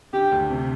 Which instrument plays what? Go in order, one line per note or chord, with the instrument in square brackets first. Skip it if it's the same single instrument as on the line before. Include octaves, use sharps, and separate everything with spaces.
[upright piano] D3 [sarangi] G4
[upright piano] D2
C3